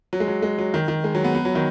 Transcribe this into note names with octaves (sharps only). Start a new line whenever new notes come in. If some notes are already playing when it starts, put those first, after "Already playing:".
F#3
G#3
F#3
G#3
F#3
D#3
D#3
G#3
F#3
B3
B3
F#3
D#3